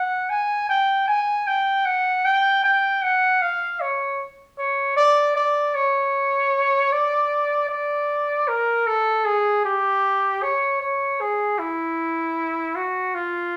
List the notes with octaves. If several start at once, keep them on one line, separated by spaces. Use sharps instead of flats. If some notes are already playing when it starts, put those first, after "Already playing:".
Already playing: F#5
G#5
G5
G#5
G5
F#5
G5
G5
F#5
F5
C#5
C#5
D5
D5
C#5
D5
D5
A#4
A4
G#4
G4
C#5
C#5
G#4
E4
F#4
F4